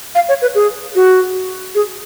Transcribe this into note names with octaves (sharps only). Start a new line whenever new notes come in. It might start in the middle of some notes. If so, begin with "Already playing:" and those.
F5
C#5
B4
G#4
F#4
G#4